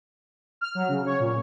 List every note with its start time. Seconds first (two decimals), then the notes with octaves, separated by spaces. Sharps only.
0.61 F6
0.75 F#3
0.88 C#3
1.05 C#5
1.20 A#2